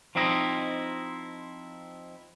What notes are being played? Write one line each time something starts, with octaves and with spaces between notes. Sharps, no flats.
F3 C4 D#4 E4 D#5